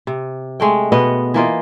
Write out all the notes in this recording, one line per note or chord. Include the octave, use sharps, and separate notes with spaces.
C3
G#3 A3 G5
B2 B3 D#5
E3 A#3 F4 D#5